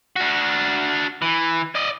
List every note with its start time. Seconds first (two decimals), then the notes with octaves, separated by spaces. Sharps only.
0.16 D4 F#4
1.22 E3
1.75 D5 D#5